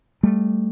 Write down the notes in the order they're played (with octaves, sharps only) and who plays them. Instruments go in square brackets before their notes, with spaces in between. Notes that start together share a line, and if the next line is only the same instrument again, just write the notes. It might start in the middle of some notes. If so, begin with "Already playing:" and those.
[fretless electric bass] G3 A3